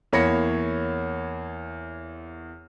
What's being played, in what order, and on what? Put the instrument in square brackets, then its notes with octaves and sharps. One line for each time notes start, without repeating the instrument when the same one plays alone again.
[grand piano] E2 A#3 C#5 B5 A#6 C#7